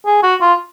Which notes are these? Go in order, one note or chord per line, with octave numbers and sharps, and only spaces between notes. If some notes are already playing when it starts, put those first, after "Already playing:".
G#4
F#4
F4